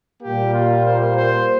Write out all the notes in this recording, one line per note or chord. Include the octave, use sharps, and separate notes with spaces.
A#2 G3 A#3 G4
F4
C5
C5